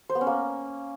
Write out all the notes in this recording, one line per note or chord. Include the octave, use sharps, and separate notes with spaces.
C5
B3
C#4
A#3